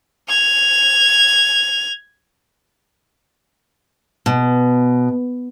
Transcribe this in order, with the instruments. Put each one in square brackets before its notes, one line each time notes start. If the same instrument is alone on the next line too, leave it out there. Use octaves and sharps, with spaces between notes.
[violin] G#6 F7
[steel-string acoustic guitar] B2